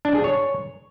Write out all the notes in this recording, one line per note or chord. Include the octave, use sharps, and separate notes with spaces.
D4
G#4
C#5